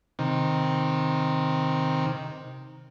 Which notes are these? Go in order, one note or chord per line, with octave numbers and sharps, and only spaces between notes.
C3 D#3